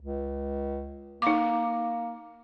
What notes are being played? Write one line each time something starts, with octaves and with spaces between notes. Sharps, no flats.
C#2
A#3 D#4 D6